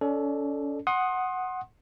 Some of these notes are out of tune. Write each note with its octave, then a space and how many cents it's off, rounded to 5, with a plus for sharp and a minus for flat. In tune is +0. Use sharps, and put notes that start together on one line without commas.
C#4 +35 A4 +0 D5 +35
F#5 +0 C6 +30 D#6 +0